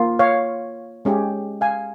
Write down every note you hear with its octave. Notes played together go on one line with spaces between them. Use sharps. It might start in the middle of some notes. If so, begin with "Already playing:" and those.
Already playing: A#3 F4
C#5 F5
G#3 C#4 G4
F5 G#5